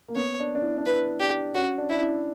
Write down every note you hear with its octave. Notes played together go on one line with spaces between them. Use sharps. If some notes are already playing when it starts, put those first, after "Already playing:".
A#3
B3 C#5
D4
D4
E4
D4
E4 B4
D4 G4
C#4 F#4
D4
D4 E4
E4